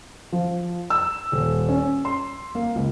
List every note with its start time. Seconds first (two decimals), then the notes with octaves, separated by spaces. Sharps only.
0.33 F3
0.90 E6
1.32 D#1
1.69 C#4
2.05 C6
2.55 A#3
2.75 C#2